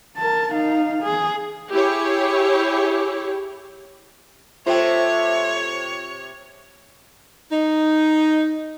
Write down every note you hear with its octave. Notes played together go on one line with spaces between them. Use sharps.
A#4 A5
D#4 F5
G#4
E4 G4 G#4 C#5
C3 A3 C4 F4 C5 C#5 G5
D#4